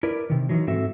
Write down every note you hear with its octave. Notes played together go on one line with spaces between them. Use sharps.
E4 A#4 B4 D5
C3 D#3
D#3 E3 F#3
G#2 C4 F#4 A4 E5